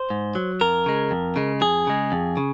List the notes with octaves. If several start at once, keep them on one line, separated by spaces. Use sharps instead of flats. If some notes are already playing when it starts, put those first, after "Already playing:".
Already playing: C5
G#2
F#3
F2 A#4
C#3 G#3
F2
C#3 G#3
F2 G#4
C#3 G#3
F2
C#3